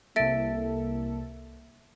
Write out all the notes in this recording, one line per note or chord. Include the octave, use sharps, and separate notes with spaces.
C2 A#3 A4 E5 A6 D7